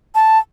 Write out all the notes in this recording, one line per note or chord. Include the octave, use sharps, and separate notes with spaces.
A5